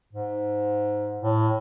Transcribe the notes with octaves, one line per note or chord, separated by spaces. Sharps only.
G#2
A2